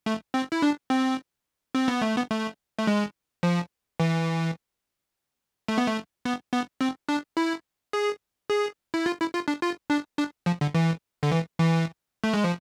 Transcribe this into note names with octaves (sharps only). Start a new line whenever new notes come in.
A3
C4
E4
D4
C4
C4
B3
A3
B3
A3
A3
G#3
F3
E3
A3
B3
A3
B3
B3
C4
D4
E4
G#4
G#4
E4
F4
E4
F4
D4
F4
D4
D4
F3
D3
E3
D3
E3
E3
A3
G#3
F3